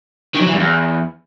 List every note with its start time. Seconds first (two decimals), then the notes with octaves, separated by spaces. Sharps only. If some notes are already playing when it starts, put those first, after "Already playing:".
0.35 D#3
0.41 F#3
0.47 E3
0.53 G2
0.60 E2